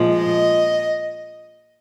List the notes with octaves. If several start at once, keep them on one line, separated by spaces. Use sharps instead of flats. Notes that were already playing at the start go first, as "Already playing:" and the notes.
Already playing: A#2 F3 G#3
D#5